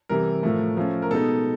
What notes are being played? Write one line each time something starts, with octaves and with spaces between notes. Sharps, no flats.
C3 E3 G3 A#4
A2 F3 A3
F3 A3 C#4
A#4
B2 G#3 B3 D#4 A4